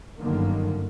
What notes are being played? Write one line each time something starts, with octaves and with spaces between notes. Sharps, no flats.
G1 F#2 D3 D#3 A#3